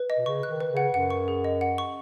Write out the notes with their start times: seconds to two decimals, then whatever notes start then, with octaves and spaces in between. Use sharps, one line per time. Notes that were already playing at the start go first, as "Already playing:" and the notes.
Already playing: B4
0.10 D#5
0.17 B2
0.26 C#3 C#6
0.43 F#6
0.49 D#3
0.60 B4
0.71 C#3
0.77 F#5
0.93 F#2 F#5
1.10 C#6
1.28 G#4
1.44 D#5
1.61 F#5
1.78 C#6